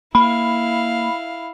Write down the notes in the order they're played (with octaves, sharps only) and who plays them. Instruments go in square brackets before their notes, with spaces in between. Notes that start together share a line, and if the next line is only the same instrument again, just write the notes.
[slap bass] A#3 [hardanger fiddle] E4 F5 [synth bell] B5